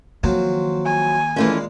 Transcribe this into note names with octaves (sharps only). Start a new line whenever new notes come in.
D#3 F3 F#3 A#3 C4
G#5
A#2 E3 G#3 A3 C#4 F5